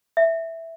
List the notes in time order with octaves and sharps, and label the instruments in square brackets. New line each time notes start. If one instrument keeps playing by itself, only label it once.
[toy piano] E5